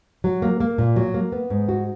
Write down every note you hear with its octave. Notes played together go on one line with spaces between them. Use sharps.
F#3
A#3
A#3
A#2
F#3
A#3
B3
G#2
F#4